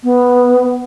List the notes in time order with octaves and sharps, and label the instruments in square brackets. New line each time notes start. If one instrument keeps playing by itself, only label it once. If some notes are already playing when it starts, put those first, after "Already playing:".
[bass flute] B3